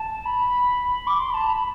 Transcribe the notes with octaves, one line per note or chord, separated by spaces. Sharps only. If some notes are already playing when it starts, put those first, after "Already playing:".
Already playing: A5
B5
D6
C6
B5
A5
B5